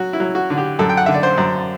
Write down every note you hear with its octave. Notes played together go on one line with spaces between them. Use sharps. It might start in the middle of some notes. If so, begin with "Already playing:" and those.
Already playing: F#3 F#4
E4
F#3
F#4
D3
G4
F#2 A4
G5
F#5
D3 E5
D5
C5
F#2